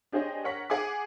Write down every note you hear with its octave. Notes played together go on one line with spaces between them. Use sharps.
D4 G4 G#4 C5 C#5 D#5
A#4 C#5 F#5 C#6 B6
G#4 F#5 G#5 D6